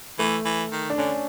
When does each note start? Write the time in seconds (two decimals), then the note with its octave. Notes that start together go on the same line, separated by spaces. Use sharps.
0.19 E3 A3
0.45 E3
0.72 D#3
0.90 D4
0.98 D3 C#4